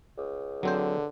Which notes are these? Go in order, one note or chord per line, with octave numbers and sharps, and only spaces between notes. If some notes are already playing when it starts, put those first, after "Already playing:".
C#2
D3 F#3 C4 C5